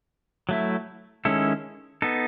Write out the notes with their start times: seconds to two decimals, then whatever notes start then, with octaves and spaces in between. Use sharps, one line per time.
0.49 F#3 A3 E4
1.25 D#3 G#3 C#4 E4 A4
2.02 B3 D#4 A4